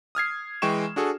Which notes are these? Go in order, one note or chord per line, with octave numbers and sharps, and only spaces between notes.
D#6 F6 G#6 C7
E3 G#3 G5 C#6 E7
D4 F#4 G#4 A4